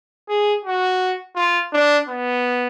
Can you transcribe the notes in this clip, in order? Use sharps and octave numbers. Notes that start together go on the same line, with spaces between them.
G#4
F#4
F4
D4
B3